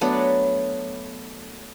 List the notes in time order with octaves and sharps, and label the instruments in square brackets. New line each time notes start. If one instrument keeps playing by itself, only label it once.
[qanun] F#3 A3 B3 D4